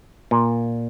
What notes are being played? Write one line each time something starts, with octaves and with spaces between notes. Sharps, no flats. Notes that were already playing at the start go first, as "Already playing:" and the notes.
A#2